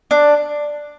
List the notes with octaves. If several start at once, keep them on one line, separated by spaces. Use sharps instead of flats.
D4